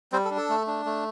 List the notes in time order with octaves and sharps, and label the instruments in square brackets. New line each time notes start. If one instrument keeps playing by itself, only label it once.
[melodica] G3 C4 C5
A4
D4
A4
A3
D4
A3